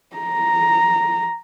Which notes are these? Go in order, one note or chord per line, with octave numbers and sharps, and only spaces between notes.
A#5